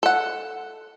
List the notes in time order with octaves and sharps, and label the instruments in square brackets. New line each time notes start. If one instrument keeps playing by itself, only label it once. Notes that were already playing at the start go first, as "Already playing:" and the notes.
[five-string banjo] A4 F#5